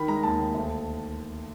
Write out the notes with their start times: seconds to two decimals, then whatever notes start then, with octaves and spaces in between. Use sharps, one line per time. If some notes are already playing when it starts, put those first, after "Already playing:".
Already playing: D#3 B5
0.08 G#3 A#5
0.23 D#2 A5
0.40 D#2
0.54 D2